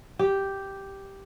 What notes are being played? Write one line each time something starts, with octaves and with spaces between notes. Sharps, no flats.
G4